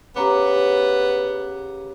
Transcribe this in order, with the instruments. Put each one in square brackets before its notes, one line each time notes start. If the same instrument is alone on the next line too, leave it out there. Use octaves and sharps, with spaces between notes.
[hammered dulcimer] C#3 [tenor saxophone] B3 [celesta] G4 A#5 D6